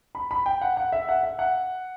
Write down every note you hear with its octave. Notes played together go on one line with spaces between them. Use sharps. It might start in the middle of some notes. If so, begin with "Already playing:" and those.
B5
B5
G5
F#5
F#5
E5
F#5
E5
F#5